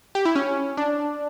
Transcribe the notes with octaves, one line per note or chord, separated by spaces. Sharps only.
G4
E4
C#4
D4